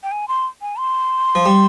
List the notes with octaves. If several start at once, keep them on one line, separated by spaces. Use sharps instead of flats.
G5
G#5
C6
G#5
C6
F3
G3